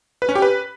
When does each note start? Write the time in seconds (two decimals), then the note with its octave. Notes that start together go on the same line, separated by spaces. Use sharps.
0.22 B4
0.29 C#4
0.35 G4
0.42 B4